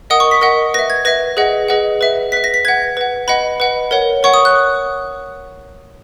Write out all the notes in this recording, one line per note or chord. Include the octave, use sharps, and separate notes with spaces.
A#4 D#5 F#5 D#6
C#6
B6
A#4 D#5 F#5
B4 E5 A#6
G#6
B4 E5 A#6
G#4 B4 D#5 F#5
G#4 B4 D#5 F#5
B4 E5
B4 E5 B6
A#6
B6
B4 F#5 G#6
B4 F#5
B4 D#5 F#5 B5
B4 D#5 F#5
A#4 C#5 F#5
A#4 C#5 F#5 C#6
D#6
F#6